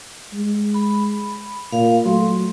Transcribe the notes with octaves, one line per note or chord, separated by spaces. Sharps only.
G#3
B5
A#2 F5
F#3 A3 C6